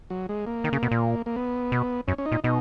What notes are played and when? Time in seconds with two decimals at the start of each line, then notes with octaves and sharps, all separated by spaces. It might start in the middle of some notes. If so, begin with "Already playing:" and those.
0.10 F#3
0.29 G#3
0.47 A#3
0.64 D#3
0.73 C#3
0.83 B2
0.91 A#2
1.26 A#3
1.36 B3
1.72 B2
2.07 F#2 C#4
2.18 C#4
2.26 D#4
2.32 A#2
2.44 B2 D#4